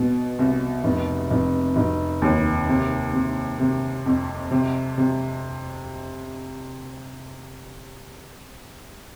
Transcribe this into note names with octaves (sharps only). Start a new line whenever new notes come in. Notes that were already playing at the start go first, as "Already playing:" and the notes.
Already playing: B2
C2
F1
F1
F1
D#2
C3
C3
C3
F2
C3
C3